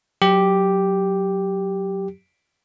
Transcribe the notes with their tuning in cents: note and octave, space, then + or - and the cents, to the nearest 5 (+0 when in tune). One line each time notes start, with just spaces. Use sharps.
F#3 +0 G4 +0